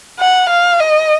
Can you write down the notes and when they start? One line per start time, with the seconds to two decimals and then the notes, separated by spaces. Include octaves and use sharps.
0.20 F#5
0.50 F5
0.80 D#5